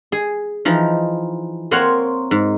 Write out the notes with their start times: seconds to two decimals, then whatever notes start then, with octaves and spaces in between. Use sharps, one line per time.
0.12 G#4
0.65 E3 F3 D#4
1.71 A#3 C4 A#4 C5 C#5 F#5
2.31 G#2